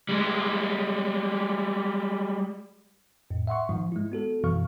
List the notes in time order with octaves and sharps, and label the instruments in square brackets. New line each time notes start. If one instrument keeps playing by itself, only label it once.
[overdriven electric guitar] G3 G#3
[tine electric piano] F2 A2
E5 F#5 C6 C#6
G#2 D#3 F3
G#3 E4
B3 F#4 A4
F#2 B2 E3 F5 C#6 F6